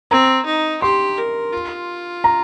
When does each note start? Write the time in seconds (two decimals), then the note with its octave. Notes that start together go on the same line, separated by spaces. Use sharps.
0.11 C4 A#5
0.46 D#4
0.82 G4 C6
1.18 A#4
1.53 F4
2.24 A#5